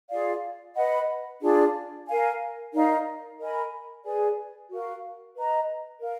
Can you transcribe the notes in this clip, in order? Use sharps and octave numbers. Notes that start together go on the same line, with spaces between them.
F4 G#4 D5 F5
B4 D#5 F#5 B5
D4 F4 G#4 D5
A#4 F5 G#5
D#4 A#4 D5 F5
A#4 D#5 G#5 B5
G#4 B4 D5 G#5
F#4 A#4 F5
B4 D#5 A#5
A#4 F5